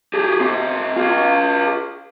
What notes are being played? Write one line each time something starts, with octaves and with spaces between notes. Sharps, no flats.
G4 G#4
C4 G#4
F4 G#4